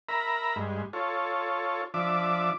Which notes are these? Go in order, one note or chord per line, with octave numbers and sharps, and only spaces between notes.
A#4 E5 A#5 B5
G2 G#3
F4 A4 C#5
F3 D4 E5 D6